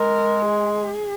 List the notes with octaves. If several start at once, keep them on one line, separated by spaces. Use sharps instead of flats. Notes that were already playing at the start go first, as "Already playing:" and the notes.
Already playing: G#3 A#4
G#4